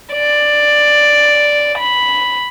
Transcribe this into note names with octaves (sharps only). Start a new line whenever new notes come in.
D5
B5